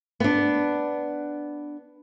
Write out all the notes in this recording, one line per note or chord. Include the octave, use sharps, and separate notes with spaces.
B3 D4